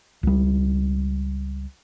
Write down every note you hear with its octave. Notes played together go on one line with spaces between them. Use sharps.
C#2 G3